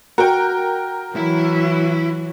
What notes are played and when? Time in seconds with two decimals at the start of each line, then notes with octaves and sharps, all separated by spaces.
0.18 F#4 A#4 G5
1.16 E3 F#3 E4